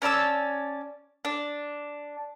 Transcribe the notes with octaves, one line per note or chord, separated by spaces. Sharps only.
C#4 D5 A5 E6
D4